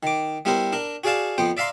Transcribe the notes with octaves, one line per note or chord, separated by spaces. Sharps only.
D#3 D6
G3 B3 E4 A#4 C5
D4 A#4
F#4 G#4 D5 F5 A5
F2 B3 C5 G5
D5 E5 F5 A#5 C6